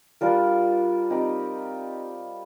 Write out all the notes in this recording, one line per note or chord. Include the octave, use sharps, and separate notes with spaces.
G3 D4 F4 A#4
C4 D#4 G4